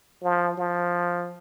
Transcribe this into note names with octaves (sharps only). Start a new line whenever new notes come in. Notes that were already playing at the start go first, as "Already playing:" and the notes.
F3
F3